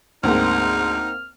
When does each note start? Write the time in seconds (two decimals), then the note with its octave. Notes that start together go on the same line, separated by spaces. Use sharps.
0.23 D2 G#2 A#3 C4 D#4 F6